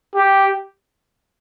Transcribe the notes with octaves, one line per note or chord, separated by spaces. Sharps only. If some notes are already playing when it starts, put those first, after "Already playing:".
G4